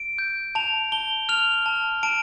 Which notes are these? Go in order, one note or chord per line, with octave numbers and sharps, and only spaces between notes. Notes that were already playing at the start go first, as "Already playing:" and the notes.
Already playing: D7
G6
A5 F7
A5 G7
F6 F7
A5
A5 D7